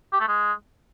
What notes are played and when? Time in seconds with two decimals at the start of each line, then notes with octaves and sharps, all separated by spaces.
0.13 G4
0.20 A3
0.28 G#3